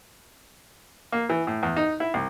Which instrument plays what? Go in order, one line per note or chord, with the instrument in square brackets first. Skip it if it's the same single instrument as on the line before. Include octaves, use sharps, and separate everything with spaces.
[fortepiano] A#3
E3
A2
E2
D#4
E4
C2